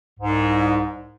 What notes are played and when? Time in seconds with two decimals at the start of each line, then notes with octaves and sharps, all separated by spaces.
0.19 C2 G#2